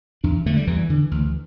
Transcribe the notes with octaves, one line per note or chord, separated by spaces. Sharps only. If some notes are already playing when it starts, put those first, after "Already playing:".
E2 D4
D3 A3
G3
E2 E3
D3
D2